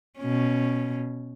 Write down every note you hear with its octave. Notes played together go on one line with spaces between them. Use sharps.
B2 C#4